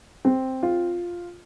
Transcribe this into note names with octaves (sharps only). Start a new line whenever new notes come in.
C4
F4